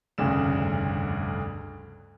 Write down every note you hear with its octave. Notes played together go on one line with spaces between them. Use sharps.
F1 D2 G2 C#3 E7